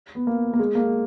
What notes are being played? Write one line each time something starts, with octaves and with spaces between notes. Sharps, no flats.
B3
A#3
A#3
G#3
A#3